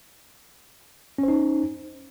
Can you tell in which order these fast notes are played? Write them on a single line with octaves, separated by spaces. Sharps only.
C#4 C5 D#4